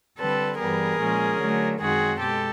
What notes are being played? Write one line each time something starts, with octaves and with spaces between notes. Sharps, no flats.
D3 G3 C4 A4 B4
G2 E3 G3 B3 G#4 A#4
A#2 F3 G#3 C#4
D3 F#3 A3
F#2 D#3 G#3 C4 F#4 G#4
B2 G#3 G4 A4